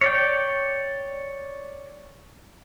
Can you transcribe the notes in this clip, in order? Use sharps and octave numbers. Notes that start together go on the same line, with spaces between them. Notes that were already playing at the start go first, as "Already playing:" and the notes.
C#5 D5 G5